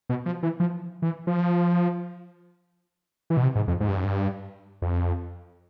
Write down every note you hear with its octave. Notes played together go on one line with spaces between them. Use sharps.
B2
F3
E3
F3
E3
F3
E3
B2
C3
G#2
F2
G#2
G2
F#2
G2
F2